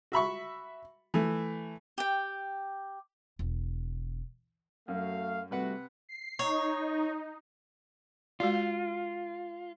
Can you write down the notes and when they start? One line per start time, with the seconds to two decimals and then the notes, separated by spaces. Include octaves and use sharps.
0.12 F#4 E5 B5 C#6
1.14 E3 A3
1.98 G4 G5
3.39 E1
4.88 F#2 F#3 A3 F5
5.51 C3 G3 A3 F#4 B4 F#5
6.09 C7
6.39 D#4 C#5
8.40 G#3 F4 F#4 D5